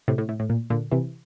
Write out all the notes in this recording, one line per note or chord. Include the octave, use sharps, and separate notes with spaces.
A2 C3
A2
A2
A2
A#2
A#2 D3
C3 E3